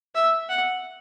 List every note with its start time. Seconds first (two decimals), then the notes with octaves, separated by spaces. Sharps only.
0.15 E5
0.49 F#5